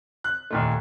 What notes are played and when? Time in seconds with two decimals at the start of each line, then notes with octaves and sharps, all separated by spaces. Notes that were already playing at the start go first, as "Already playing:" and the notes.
0.24 F#6
0.51 D#2 A#2 A3